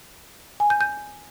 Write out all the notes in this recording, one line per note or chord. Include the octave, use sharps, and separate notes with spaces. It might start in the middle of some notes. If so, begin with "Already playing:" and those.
G#5
G6
G6